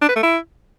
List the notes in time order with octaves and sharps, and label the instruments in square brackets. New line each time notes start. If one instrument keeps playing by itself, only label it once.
[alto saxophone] D4
B4
A3
E4